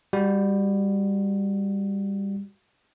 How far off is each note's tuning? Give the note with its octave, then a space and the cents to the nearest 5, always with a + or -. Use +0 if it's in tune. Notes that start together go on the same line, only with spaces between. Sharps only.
G3 +20 F#4 +0